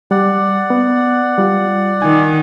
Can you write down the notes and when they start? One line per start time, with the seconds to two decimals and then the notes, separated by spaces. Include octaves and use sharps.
0.11 G3 D5 F#5
0.70 B3
1.38 G3 F4
2.02 D#3 G#5